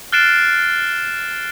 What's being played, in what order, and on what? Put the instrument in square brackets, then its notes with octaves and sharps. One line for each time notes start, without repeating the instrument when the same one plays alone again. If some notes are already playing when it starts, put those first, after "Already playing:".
[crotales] F6 F#6 A6 C7 D7 E7